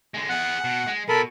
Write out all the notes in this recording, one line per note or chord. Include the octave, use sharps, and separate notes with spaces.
D3 G#3
B3 G#4 F#5
B2
G#3
B2 A4 A#4 B5